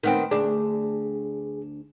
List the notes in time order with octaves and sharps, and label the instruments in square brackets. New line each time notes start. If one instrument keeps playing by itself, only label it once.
[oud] D#3 B3 C4
[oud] D2 D4 [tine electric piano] G#4